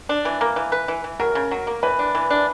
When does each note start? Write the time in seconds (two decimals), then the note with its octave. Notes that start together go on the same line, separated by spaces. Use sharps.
0.09 D4
0.25 E3
0.41 A#3
0.56 E3
0.72 B4
0.88 E3
1.04 E3
1.20 F#3 A#4
1.35 C#3
1.51 F#3
1.67 A#3
1.83 E3 B4
1.99 D4
2.15 E3
2.30 D4